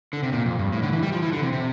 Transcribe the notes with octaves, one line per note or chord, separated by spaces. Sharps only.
D3
C3
A#2
F2
G2
A2
D3
E3
G3
F3
E3
D3
C3
C3